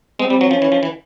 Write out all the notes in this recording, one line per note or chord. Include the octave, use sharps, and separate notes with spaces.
G#3 C4
G3
F#3
F3 C#4
E3
F3
E3